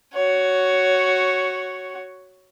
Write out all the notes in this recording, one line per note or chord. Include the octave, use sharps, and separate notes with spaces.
F#4 C#5